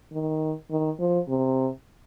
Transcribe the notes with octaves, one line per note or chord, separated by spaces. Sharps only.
D#3
D#3
F3
C3